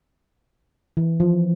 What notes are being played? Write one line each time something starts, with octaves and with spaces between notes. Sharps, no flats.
E3
F3